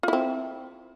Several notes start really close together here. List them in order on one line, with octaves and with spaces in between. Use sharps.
F4 E4 C4